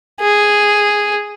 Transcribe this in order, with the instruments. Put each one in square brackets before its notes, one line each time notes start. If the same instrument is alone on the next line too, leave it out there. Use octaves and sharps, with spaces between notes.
[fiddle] G#4